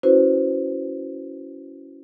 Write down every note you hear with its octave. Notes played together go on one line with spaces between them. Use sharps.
C#4 E4 F#4 B4 C5